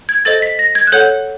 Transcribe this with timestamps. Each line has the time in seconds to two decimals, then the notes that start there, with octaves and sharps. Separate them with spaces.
0.09 G#6
0.25 A4 C5 D#5 A6
0.42 B6
0.59 A#6
0.75 G#6
0.87 F#6
0.92 A4 C#5 F#5 G6